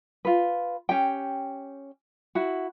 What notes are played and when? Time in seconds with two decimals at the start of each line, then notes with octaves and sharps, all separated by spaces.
0.25 F4 B4
0.89 C#4 G4 G5
2.35 E4 F#4